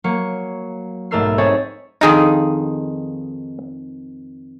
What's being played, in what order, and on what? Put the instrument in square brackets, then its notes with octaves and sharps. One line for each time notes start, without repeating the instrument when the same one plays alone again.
[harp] F#3 A#3 C#7
B1 G#2 A3 A#4 E6 C7
C4 D#4 G#4 A4 C#5 E5
[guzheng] F2 D#3 F4 [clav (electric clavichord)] D#4 G#4